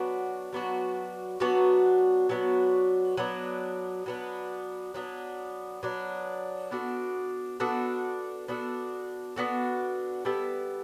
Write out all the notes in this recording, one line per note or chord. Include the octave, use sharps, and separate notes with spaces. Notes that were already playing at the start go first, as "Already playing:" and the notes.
Already playing: F#3 B3 D4 F#4
F#3 B3 D4 F#4
F#3 B3 D4 F#4
F#3 B3 D4 F#4
F#3 B3 D4
F#3 B3 D4
F#3 B3 D4
F#3 B3 D4
B3 D4 F#4 A4
B3 D4 F#4 A4
B3 D4 F#4 A4
B3 D4 F#4 A4
G3 B3 E4 A4